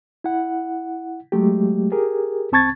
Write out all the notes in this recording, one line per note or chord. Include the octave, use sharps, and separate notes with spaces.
E4 F#5
F#3 G#3 A3 G4
G4 G#4 A#4
C2 C4 A5 C#6 G#6 A6